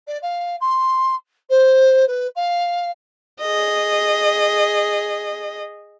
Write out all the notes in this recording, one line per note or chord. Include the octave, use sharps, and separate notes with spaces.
D5
F5
C6
C5
B4
F5
G#4 D#5